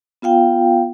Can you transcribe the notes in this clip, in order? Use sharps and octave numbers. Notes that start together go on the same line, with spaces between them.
B3 F4 F5 G5